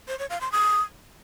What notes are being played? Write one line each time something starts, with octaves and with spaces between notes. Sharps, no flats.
C5
C#5
F5
C6
D#6